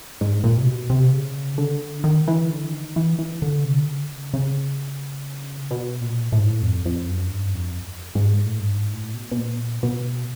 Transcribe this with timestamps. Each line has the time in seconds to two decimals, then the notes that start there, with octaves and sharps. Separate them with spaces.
0.21 G#2
0.44 A#2
0.58 C3
0.67 B2
0.90 C3
1.13 C#3
1.58 D3
2.04 D#3
2.28 E3
2.50 D3
2.64 E3
2.73 D#3
2.96 E3
3.19 E3
3.42 D3
3.65 C3
3.80 D3
3.88 C#3
4.34 C#3
5.71 B2
6.01 A#2
6.32 A2
6.39 G#2
6.46 A2
6.62 F2
6.86 F2
7.09 F#2
7.31 G2
7.54 F2
8.15 G#2
8.45 A2
8.60 G2
8.69 G#2
8.92 A2
9.14 B2
9.31 B2
9.38 A#2
9.83 B2